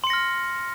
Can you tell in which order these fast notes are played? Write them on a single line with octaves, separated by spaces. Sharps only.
C6 C#7 A#6 F6